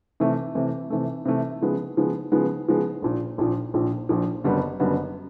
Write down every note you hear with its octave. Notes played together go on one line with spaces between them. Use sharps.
C3 E3 A3
C3 E3 A3
C3 E3 A3
C3 E3 A3
C#3 F3 G#3 B3
C#3 F3 G#3 B3
C#3 F3 G#3 B3
C#3 F3 G#3 B3
A#1 A#2 F3
A#1 A#2 F3
A#1 A#2 F3
A#1 A#2 F3
F#1 F#2 D3 G3 B3
F#1 F#2 D3 G3 B3